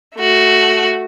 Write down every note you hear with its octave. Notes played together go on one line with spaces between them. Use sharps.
A3 F#4